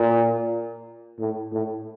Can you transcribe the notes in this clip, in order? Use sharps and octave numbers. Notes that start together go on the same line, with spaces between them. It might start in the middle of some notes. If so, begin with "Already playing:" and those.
Already playing: A#2
A2
A2